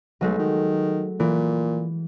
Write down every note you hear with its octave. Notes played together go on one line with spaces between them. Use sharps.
B1 F#3 G#3 A3
D#3
A#2 E3